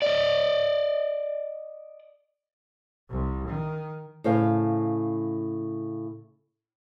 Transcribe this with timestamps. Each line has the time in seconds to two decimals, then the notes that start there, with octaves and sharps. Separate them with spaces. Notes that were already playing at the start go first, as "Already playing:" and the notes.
0.02 D5 D#5
3.10 C2
3.47 D#3
4.24 A2 C#3 C5 F5